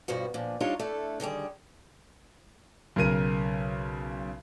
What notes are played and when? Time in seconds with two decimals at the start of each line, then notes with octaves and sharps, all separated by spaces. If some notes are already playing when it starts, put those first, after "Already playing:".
0.08 G2 B2 F3 F#4
0.34 A#2 F3 D4
0.60 F3 G3 D4 D#4 F4 C#5
0.79 A3 D4 E4 A4
1.20 D3 D#3 G3 G#4
2.96 B1 C#3 A#4 D#7